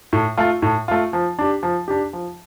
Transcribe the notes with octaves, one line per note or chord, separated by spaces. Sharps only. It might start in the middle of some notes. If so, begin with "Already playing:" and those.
A2
A3 F4
A2
A3 F4
F3
D4 G4
F3
D4 G4
F3